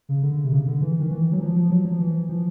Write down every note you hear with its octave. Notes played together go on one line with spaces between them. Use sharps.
C#3
D3
C3
C#3
C#3
D3
E3
D#3
E3
F#3
F3
F3
F#3
F3
E3
F3